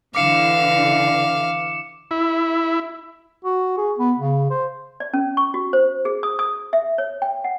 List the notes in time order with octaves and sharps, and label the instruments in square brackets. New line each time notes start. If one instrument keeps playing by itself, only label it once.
[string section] D3 E3 [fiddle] F5 [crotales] D6 C#7 E7
[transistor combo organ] E4
[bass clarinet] F#4
G#4
B3
C#3
C5
[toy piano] D5
C#4
C#6
F#4
C5
G#4
D#6
D#6
E5
C#5
G5
F#5